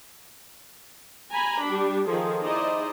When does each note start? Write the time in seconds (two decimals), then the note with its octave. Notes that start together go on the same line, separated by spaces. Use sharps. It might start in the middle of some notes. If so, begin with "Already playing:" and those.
1.32 G#5 A#5 B5
1.64 G3 D4
2.07 D#3 F3 G#4 A4
2.41 D#4 E4 G#4 C5 D5 D#5